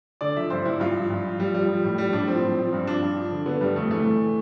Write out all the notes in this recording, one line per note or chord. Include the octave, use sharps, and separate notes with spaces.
D3 D5
F3 E5
G2 C5
G2 E4
G2 F4
F3
G2
F3
F3 G3
F3 G3
F3
A2
F3 G3
A2 D4
F3 C4
F3
F3
G2
F3 D4
G2
F3
D3
D3 B3
G2 G3
F2 A3
E3 A3
E3